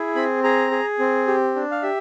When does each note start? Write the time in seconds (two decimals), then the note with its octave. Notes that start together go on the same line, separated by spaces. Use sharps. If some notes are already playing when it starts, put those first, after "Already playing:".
Already playing: E4 G#4
0.15 C4 B5
0.44 G#4 A#5
0.71 G#4
0.99 C4
1.27 G4
1.55 D4
1.71 F5
1.83 G4 E5